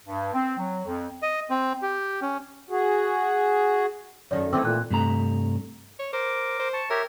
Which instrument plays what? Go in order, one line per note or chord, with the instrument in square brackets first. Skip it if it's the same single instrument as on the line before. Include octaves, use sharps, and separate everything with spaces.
[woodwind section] G2
C4
F#3
F2
[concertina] D#5
C4
G4
C#4
[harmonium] F#4 G#4
[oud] F#2 D#3 A3 [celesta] C#5 D5
[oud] D#3 E3 A3 [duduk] C4 [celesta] D6 E6
[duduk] A#2 [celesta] F#6
[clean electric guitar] G2 C3 A3 A#5
[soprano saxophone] C#5
[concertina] A#4 D6 [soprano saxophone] C5
[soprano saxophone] C5
[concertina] A5 C#6
[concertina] G4 C#5 E5 [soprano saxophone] A#4